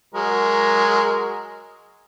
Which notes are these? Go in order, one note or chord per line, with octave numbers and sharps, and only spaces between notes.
F#3 G#3 A#4